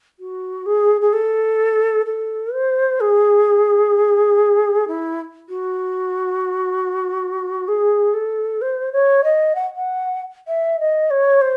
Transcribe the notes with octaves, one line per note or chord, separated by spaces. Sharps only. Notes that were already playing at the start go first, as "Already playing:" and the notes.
F#4
G#4
G#4
A4
A4
C5
G#4
E4
F#4
G#4
A4
C5
C#5
D#5
F#5
F#5
E5
D#5
C#5
C5